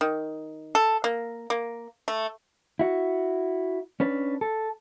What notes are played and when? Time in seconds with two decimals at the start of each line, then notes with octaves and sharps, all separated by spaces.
0.01 D#3
0.75 A4
1.04 A#3
1.50 A#3
2.08 A3
2.79 E4 F#4
4.00 C#4 D4 B4
4.41 A4